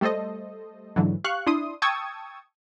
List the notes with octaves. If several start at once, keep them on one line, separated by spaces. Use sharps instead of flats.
G3 A3 A4 C5 D#5
G#2 D3 E3 F#3
G4 F5 C#6 F#6
D4 E4 C6 D#6
G5 A5 C#6 D#6 E6 G#6